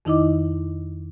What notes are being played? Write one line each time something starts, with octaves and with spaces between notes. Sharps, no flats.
F2 D#3 D#4 E4 D#5 D6